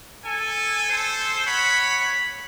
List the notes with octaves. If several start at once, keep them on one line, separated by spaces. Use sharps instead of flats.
A4 G#5
A4 C5
C#5 F#5 B5